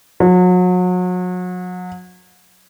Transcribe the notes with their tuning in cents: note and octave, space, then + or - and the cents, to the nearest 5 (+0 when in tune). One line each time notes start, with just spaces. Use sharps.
F#3 -35